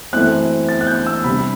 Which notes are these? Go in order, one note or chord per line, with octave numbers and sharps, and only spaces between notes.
F#2 E3 A3 C4 E4 F#6
A6
F#6
G6
E6
C2 C3 G3 D4 B5